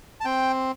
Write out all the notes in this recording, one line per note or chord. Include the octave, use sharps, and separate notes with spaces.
A5
C4 G5